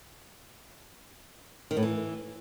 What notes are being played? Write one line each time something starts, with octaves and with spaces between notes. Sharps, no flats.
D#3
A2
E3